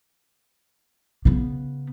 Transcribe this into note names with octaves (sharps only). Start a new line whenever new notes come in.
C#3 B3